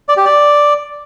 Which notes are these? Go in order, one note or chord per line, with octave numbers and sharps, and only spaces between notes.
D5
G4
D5